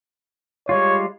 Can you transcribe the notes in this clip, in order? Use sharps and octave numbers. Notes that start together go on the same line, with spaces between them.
G3 G#3 F4 C#5